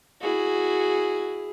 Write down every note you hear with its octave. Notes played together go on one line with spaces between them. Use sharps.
E4 F#4 G#4